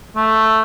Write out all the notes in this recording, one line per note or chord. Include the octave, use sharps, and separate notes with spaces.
A3